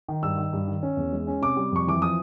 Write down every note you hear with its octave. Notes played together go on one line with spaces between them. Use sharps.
D#3
G2 E6
D#3
G2
D#3
C#4
E2
G#3
C#4
C3 D6
G3
F2 C#6
E3 D6
F3 D#6